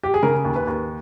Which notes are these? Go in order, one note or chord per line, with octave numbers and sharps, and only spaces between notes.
G4
G#4
C#3 A#4
D#2
B4
D#2